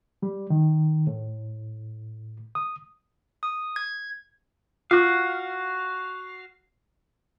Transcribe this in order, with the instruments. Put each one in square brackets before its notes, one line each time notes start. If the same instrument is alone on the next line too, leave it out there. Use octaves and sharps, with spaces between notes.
[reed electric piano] G3
D#3
A2
D#6
[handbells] D#6
G#6
[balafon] F4 [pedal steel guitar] F#4 F5